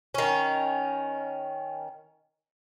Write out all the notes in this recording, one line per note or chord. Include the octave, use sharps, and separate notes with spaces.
D#3 C#4